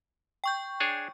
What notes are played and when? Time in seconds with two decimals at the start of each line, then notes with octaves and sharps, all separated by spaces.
0.44 G5 C#6 G6
0.80 D4 G#4 C#5